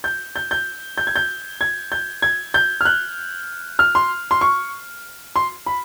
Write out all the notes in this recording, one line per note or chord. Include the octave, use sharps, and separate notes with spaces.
G6
G6
G6
G6
G#6
G6
G#6
G6
G#6
G6
F6
F#6
F6
C6
C6
C#6
C6
B5